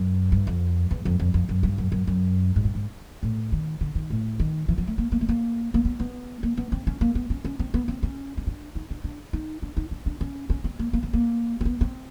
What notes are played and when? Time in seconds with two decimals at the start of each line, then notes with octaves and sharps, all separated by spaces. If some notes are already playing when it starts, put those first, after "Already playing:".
Already playing: F#2
0.32 G2
0.47 F2
0.91 E2
1.05 F2
1.19 F2
1.34 F2
1.49 F#2
1.63 G2
1.78 F#2
1.92 F#2
2.07 F#2
2.56 G#2
2.65 G2
2.75 G#2
3.23 A2
3.52 D#3
3.81 D3
3.95 D#3
4.10 A2
4.40 D#3
4.68 E3
4.78 F3
4.87 A3
4.98 A#3
5.12 A#3
5.21 A3
5.29 A#3
5.74 A#3
5.85 B3
5.99 B3
6.43 A#3
6.57 B3
6.72 C4
6.87 C#4
7.01 A#3
7.15 B3
7.30 C#4
7.45 C#4
7.59 C4
7.74 B3
7.88 C4
8.03 C#4
8.37 C#4
8.47 D4
8.75 D#4
8.90 D4
9.04 D4
9.33 D#4
9.62 D4
9.77 D#4
9.91 D4
10.06 D4
10.21 C#4
10.50 C#4
10.64 C4
10.79 A#3
10.93 A#3
11.03 B3
11.13 A#3
11.61 C4
11.65 B3
11.81 C4